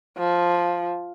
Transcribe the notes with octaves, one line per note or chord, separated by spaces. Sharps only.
F3